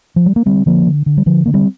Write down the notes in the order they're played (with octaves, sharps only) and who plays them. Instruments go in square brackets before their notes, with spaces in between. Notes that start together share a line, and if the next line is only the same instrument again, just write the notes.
[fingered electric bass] F3
G3
A#3
D3 G3 C4
D3 F3 A#3
D3
D3
G3
D3 F3
D3 A#3
G3 C4